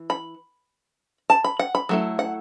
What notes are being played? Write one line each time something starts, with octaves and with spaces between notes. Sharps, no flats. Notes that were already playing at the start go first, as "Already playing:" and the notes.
Already playing: E3
B5
A5
B5
F#5
B5
F#3 A3 E4
F#5